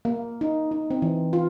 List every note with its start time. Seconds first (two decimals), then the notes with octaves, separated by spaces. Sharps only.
0.05 A#3
0.41 D#4
0.71 D#4
0.91 C4
1.02 E3
1.33 F4